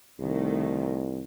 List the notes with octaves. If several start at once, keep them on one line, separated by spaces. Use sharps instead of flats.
C2 D#3 A3